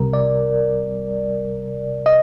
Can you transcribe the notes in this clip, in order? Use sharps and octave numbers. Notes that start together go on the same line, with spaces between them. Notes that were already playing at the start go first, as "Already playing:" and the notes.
Already playing: C2 C3 G3 A#4
D5
D#5